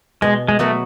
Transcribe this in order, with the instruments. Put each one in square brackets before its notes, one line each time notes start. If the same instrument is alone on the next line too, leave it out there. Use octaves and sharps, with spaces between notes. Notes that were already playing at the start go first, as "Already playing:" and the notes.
[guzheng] B2 [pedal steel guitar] G#3
[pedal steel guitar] G#3
[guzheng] F#3 B3 F#4 B4 [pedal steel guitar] A3